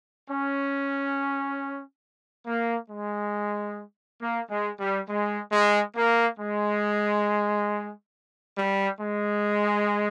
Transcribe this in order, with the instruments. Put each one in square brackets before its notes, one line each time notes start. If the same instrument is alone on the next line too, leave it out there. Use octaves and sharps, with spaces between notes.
[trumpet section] C#4
A#3
G#3
A#3
G#3
G3
G#3
G#3
A#3
G#3
G3
G#3